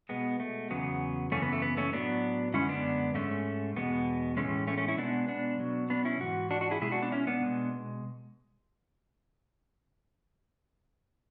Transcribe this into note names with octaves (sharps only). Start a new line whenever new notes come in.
B2 G#3 B3
A3
E2 C#3 F#3 B3
F#2 C#3 E3 A3 C#4
B3
A3
B3
A3 C#4
A2 F#3 B3 D4
F#2 D3 G#3 C#4 E4
B3 D4
G#2 G#3 A3 C#4
E2 B2 G#3 B3
A2 E3 G#3 A3 C#4
A3 C#4
A3 C#4
C#4 E4
B2 G#3 B3 D4
B3 D4
B2 F#3
B3 D4
C#4 E4
G#2 E3 F#4
D4 F#4
D4 F#4
E4 G#4
B2 G#3 E4 G#4
D4 F#4
B3 D4
C#4 E4
B3 D4
B2 G#3